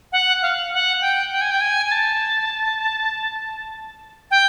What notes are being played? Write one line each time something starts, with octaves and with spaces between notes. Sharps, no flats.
F#5
F5
F#5
G5
G5
G#5
G5
G#5
G#5
A5
G5